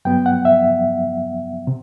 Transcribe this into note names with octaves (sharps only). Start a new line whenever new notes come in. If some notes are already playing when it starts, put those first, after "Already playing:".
G2 F#3 B3 G5
F#5
E5
C3